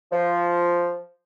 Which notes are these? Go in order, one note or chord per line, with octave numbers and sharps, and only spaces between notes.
F3